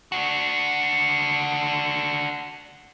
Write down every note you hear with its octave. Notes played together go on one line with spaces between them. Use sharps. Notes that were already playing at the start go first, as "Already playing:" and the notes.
D4 F#4